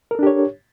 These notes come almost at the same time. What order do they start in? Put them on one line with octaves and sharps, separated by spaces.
A#4 A4 D4 G4 C#5